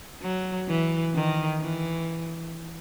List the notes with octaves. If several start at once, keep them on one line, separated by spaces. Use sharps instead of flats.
F#3
E3
D#3
E3